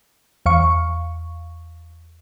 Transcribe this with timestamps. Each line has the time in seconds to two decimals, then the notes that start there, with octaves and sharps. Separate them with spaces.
0.46 E2 F5 C#6